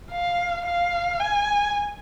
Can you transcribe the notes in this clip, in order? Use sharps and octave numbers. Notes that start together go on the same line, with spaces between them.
F5
F5
G#5